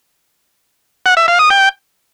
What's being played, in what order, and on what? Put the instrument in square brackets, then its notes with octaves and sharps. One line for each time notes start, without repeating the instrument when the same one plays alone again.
[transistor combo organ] F#5
E5
F5
D#6
G5